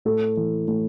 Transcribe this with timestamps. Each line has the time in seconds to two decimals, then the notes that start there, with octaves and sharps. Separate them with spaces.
0.05 A2 A4
0.37 E3
0.68 A2